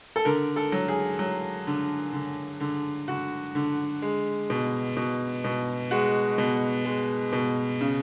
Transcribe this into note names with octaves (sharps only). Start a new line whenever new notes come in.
A4
D3 A#4
A4
F#3
G#4
F#3
D3
D3
D3
D3 F#4
D3
G#3
B2
B2
B2
G#3 F#4
B2
G#3
B2
C#3